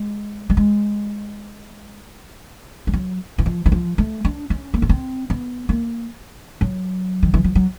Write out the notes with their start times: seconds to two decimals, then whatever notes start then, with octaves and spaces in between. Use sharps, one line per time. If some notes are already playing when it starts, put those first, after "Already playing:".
Already playing: G#3
0.50 G3
0.57 G#3
2.87 G3
2.93 F#3
3.38 E3
3.46 F3
3.66 E3
3.72 F3
3.98 A3
4.25 D4
4.50 C#4
4.74 A#3
4.82 B3
4.89 C4
5.30 B3
5.69 A#3
6.61 F#3
7.23 D#3
7.34 E3
7.44 F3
7.55 F#3